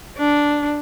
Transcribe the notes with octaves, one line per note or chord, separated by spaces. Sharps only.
D4